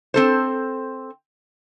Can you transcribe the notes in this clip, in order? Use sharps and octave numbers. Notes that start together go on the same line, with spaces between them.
C4 A4 C5